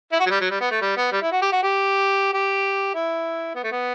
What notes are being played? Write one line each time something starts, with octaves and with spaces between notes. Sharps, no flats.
E4
F#4
F#3
G3
F#3
G3
B3
A3
G3
B3
G3
E4
F#4
G4
F#4
G4
G4
E4
B3
A3
B3